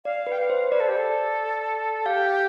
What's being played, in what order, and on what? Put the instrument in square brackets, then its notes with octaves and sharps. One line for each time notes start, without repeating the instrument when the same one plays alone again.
[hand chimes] D5 [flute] F5
[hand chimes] B4
[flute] G5
F5
[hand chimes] C5
[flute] B4 [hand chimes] D5
[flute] A4
G4
A4
[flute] G4 [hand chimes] F5